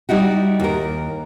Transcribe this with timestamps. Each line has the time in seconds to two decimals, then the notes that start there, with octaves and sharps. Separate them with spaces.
0.09 G3 D#4 E4 F#4
0.60 D#2 A#4